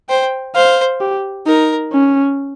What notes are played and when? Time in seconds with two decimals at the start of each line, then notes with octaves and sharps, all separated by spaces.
0.09 C5 G5
0.55 C5 F5
1.01 G4
1.47 D#4 A#4
1.93 C#4